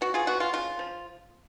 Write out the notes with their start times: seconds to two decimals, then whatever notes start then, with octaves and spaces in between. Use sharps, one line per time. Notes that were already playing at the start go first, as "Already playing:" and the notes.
0.01 B3 F#4
0.14 F4 G#4
0.27 B3 F#4
0.40 F4
0.53 C#3 F4
0.79 F3